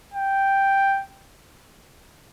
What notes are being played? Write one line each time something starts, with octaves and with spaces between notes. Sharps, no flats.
G5